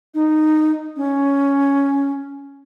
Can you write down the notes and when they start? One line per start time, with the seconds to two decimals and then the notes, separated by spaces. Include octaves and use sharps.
0.14 D#4
0.97 C#4